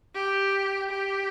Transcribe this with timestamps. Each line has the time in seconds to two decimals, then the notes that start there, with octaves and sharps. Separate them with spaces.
0.14 G4
0.90 G4